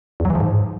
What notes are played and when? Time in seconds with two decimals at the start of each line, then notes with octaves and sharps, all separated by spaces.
0.20 E2
0.25 F#3
0.30 E3
0.35 F3
0.40 G#2